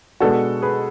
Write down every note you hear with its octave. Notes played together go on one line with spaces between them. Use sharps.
B2 G#3 B3 D4 F#4 A4
G#4 B4